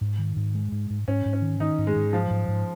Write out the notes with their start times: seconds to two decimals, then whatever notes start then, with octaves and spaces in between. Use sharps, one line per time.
0.01 G#2
0.19 D#3
0.36 G#2
0.55 G#3
0.72 G#2
0.90 G#2
1.08 G#2 C#4
1.25 G#2
1.33 C#4
1.42 D#3
1.60 D#3 D#4
1.78 G#2
1.87 G#3
1.96 G#2
2.13 F3 F#3
2.30 G#2
2.48 G#2